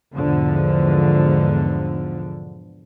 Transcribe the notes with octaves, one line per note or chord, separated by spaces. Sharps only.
E2 G#2 B2 D3 F3